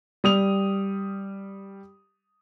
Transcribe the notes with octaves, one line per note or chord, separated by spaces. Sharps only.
G3 D#6 F7